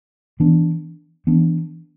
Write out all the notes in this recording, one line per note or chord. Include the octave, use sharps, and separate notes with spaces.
E3 B3 D4
E3 B3 D4